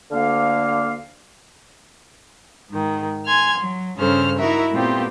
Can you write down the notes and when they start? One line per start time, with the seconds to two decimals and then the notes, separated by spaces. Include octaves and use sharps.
0.11 D2 D3 A#3 F5
2.70 G#2 D#3
3.27 G#5 C6 F6 G#6
3.59 F#3
3.97 G2 C#3 C#4 A4 C5 F6
4.39 D#4 E4 F#4 A#4 E5
4.72 A#2 A3 B3 C4 F4 G4